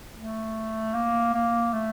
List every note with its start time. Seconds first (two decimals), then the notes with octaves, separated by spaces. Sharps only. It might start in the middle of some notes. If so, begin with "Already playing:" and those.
0.15 A3
0.95 A#3
1.34 A#3
1.73 A3